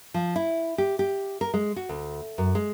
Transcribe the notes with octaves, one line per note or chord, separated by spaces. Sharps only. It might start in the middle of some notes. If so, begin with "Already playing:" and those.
F3
E4
G4
G4
A#4
G#3
F#4
D2
F#2
G#3